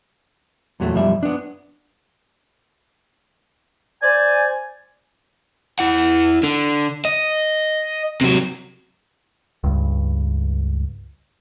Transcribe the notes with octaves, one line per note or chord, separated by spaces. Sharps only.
E2 A#2 F#3 G3 A3
B1 F#2 F3 G3 E5
B3 D4
C5 D5 G#5
E4 F#5
D3
D#5
C3 F#3
C#2 G2